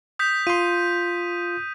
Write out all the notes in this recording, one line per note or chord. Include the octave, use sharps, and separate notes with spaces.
D#6 G6 B6
F4 C6 D#7